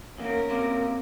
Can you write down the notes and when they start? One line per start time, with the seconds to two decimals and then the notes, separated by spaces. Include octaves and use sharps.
0.18 E2 A#3 C#4 A#4
0.49 C3 A#3